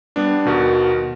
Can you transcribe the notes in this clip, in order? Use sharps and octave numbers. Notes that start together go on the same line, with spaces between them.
G3 B3 D4
D#2 B2 F#4 A#4